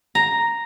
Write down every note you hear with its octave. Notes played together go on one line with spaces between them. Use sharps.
A#5